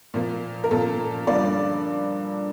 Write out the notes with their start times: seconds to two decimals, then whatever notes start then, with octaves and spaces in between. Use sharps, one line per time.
0.14 A#2 F3 A#3
0.64 A#4
0.71 A#2 F3 A#3 A4
1.27 G2 D3 F3 A#3 D5